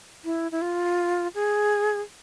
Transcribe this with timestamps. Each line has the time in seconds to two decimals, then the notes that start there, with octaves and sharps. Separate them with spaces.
0.25 E4
0.52 E4
0.62 F4
1.35 G#4